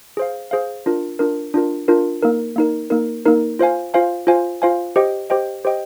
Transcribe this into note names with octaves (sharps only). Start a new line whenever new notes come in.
G#4 C5 F5
G#4 C5 F5
D4 F4 A#4
D4 F4 A#4
D4 F4 A#4
D4 F4 A#4
A#3 D#4 A#4
A#3 D#4 A#4
A#3 D#4 A#4
A#3 D#4 A#4
F4 C5 F5 G#5
F4 C5 F5 G#5
F4 C5 F5 G#5
F4 C5 F5 G#5
G4 C5 D#5 G5
G4 C5 D#5 G5
G4 C5 D#5 G5